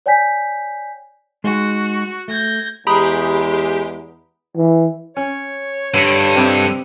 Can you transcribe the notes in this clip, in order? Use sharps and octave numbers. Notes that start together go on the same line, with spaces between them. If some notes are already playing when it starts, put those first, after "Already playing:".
C#5 D5 G5 G#5 G6 B6
G#3 D#4 F#4 G#4
A3 G6 G#6 A#6
E2 G#3 G4 A#5 B5 D#6
E3
C#4 C#5
G2 D3
C3 G3 D#5